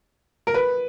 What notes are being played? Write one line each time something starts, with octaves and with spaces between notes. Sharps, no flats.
A#4
B4